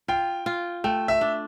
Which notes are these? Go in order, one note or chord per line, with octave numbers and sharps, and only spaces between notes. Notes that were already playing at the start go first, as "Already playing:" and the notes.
F4 G5
F4
A3 G5
E5
D4